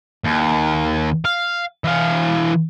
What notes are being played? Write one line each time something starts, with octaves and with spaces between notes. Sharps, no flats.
D#2
F5
E3 F5